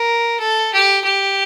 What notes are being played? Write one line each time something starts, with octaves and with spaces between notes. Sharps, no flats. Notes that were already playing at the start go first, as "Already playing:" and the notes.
Already playing: A#4
A4
G4
G4